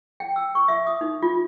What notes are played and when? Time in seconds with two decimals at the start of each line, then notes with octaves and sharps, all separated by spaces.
0.20 G5
0.36 E6
0.55 C#6
0.68 E5
0.87 D#6
1.01 D#4
1.22 F4